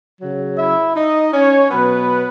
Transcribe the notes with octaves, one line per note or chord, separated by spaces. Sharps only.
C#3 F#3
E4 E5
D#4 D#5
C#4 C#5
B2 F#3 B3 B4